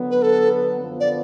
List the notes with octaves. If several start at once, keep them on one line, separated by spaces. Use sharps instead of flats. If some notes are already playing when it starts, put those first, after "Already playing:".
Already playing: D3 F#3 B3
B4
A4
F#2 D3 F3 B3
D5